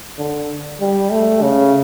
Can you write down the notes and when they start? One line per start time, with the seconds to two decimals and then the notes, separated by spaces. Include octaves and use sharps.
0.19 D3
0.80 G3
1.12 A3
1.42 C#3